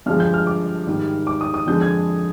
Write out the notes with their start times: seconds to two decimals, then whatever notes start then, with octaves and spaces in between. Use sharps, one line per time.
0.06 G2 D3 F3 G#3 F6
0.20 G6
0.34 F6
0.47 D6
0.87 G#2 D#3 G3
1.27 D6
1.41 D#6
1.54 D#6
1.67 F2 D3 G#3 G6
1.81 G#6